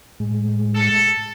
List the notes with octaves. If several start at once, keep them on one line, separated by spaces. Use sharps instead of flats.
A2 G#3
A4